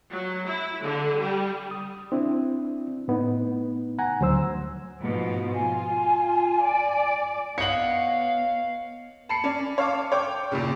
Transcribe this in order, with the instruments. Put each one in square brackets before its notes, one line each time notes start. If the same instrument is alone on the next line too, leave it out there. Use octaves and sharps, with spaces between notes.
[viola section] F#3
E4
D3
G3
[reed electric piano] D#6
C4 D4 E4
A2 B3 D#4
F#5 G#5 A#5
D2 F#3 C5 E6
[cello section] G#2 B2 F3
[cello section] F4 [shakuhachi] G#5
[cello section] D5
[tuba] B3 [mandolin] C#5 D#5 F#5 [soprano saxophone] F5 [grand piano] C#7 F#7
[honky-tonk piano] A5 B5 C7 C#7
C#4 D5
C#5 F5 A5 D6
C#5 G5 D6
E2 A#2 C#3